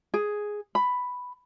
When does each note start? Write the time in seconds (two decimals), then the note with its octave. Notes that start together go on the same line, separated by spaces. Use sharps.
0.14 G#4
0.75 B5